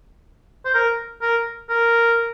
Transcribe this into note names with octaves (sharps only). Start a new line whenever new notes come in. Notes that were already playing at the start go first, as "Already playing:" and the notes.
C5
A#4
A#4
A#4